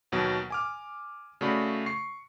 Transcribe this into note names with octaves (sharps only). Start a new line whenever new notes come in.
D#2 B2 F#3
G#5 D6 F6
C#3 A3 F#4 D5 B5
C#6 C7